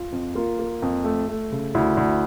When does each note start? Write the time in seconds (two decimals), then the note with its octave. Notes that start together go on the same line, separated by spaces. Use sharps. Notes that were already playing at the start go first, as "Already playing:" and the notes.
Already playing: F4
0.12 F2
0.35 A#3 F4
0.59 A#3
0.82 F2
1.04 A3
1.29 A3
1.52 C#3
1.74 D2 E4
1.97 D2